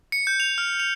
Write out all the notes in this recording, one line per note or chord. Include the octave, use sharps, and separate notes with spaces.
C#7
G6
F7
F6
F7